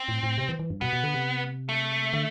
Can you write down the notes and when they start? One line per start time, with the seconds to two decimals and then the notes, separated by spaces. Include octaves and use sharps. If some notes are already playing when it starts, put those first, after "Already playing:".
Already playing: C4
0.08 A2
0.23 A2
0.38 C3
0.49 E3
0.59 E3
0.70 G2
0.81 B2 B3
0.93 B2
1.03 D3
1.14 C3
1.69 A3
2.13 D3